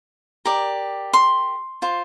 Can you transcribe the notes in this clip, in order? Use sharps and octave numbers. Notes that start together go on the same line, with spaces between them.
G4 A#4 D5
C6
F4 C5